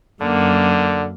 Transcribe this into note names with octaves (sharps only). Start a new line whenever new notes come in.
F#2 D3 A#3